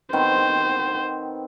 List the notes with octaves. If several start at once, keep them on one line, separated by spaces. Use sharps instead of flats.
D#3 B3 C4 C5